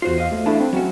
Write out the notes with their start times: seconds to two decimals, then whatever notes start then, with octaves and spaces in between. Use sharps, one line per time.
0.02 E2 F4 F#4 C5 C7
0.18 D#5 F5
0.32 A3
0.46 A3 D4 E4 A5
0.60 C4
0.73 F#3 C#4 F#4